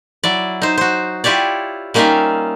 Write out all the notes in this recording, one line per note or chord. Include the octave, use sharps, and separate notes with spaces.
F#3 E4 D5
D#4 C5
F#4 C5
E4 F4 G4 C#5 D5
G3 A#3 C#4 D#4 F4 E5